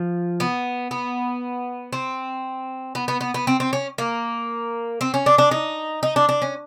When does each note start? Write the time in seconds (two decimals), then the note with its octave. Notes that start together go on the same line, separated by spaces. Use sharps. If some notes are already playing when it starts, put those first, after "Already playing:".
Already playing: F3
0.40 B3
0.91 B3
1.93 C4
2.95 B3
3.08 B3
3.21 B3
3.34 B3
3.47 C4
3.60 C4
3.73 C#4
3.98 A#3
5.01 C4
5.14 C#4
5.26 D4
5.38 D4
5.51 D#4
6.03 D#4
6.16 D4
6.29 D4
6.42 C#4